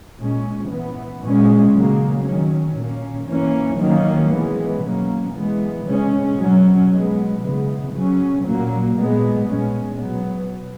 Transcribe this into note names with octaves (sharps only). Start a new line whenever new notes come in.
A#2 G#3 C#4
E3 B3
A#2 G#3 C#4
C#3 F#3 A#3
D#3 F#3 C#4
A#2 A#3 C#4
E3 A#3 C#4
D#3 F#3 A#3 C#4
E3 G#3 B3
B2 F#3 A#3 C#4
E3 G#3 B3
C#3 G#3 C#4
B2 F#3 C#4
B2 G#3 B3
C#3 E3 G#3 B3
C#3 F#3 C#4
A#2 F#3 A#3
A#2 G#3 B3
A#2 G#3 C#4
B2 F#3 B3